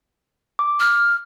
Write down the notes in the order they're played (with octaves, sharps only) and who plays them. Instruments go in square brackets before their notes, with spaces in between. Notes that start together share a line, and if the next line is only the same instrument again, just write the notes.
[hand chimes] D6
[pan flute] F6